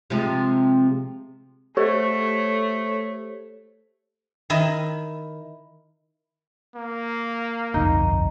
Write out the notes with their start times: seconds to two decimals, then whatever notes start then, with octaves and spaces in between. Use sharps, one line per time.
0.10 C3 F3 G#3
1.77 A3 G4 A4 C5 C#5
4.50 D#3 E4 D#5
6.76 A#3
7.74 G1 C2 F2 D#4